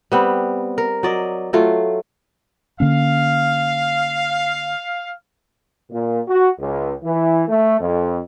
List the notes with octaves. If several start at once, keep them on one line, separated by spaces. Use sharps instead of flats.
G3 B3 C4
A#4
F#3 D5 D#5
F#3 A3 F4
D3 A#3 C#4 F5
A#2
F#4
C#2
E3
A3
F2